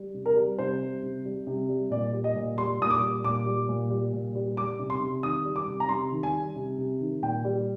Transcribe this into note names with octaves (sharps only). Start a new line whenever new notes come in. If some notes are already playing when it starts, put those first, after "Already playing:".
Already playing: G3
C3
A#4
G3
C3 C5
G3
C3
G3
C3
G3
A#2 D5
G3
D#5
A#2
G3 C6
A#2 D#6
D6
G3
A#2 D6
G3
A#2
G3
A#2
G3
G3 D6
C3
C6
C3
D#3 D#6
G3
D6
C3
A#5
C3 C6
D#3
G#5
G3
C3
C3
D#3
A#2 G5
G3